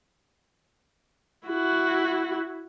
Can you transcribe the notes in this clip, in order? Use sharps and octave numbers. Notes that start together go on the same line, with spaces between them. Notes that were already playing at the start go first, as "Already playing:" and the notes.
E4 F#4